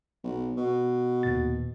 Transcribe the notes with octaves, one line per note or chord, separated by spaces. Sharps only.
B1
B2
D#2 A#2 A6